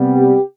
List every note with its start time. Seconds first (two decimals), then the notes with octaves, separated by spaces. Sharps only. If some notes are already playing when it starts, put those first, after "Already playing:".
Already playing: C3 G3 B3
0.16 G4